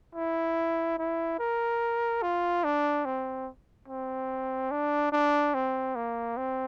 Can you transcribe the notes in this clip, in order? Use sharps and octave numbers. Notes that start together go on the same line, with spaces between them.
E4
E4
A#4
F4
D4
C4
C4
D4
D4
C4
A#3
C4